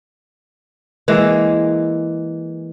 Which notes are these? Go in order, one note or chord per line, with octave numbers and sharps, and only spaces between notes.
E3 G#3 A#3